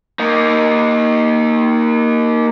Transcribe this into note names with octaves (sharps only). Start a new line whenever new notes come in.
A#3 D#4